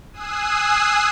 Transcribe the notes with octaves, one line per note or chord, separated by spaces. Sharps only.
G#5 D#6 E6 F#6 C7